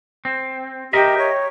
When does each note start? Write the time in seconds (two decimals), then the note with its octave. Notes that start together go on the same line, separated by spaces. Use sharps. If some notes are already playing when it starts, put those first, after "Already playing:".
0.25 C4
0.93 G4 A#4 D#5 E5
1.18 C#5